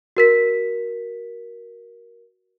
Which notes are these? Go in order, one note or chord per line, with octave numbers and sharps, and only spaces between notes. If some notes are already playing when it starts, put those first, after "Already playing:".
F#4 A#4 B6